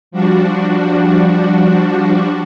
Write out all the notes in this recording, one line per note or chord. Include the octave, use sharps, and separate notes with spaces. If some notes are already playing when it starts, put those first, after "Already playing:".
F3 G3 D4 F#4